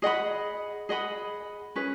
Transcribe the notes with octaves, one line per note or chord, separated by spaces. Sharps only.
G#4 D#5 F#5 B5
G#4 D#5 F#5 B5
C#4 G#4 B4